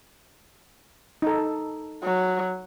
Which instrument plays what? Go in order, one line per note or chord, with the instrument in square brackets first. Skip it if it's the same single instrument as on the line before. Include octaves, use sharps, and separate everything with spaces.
[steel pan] D#4 A4
[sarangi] F#3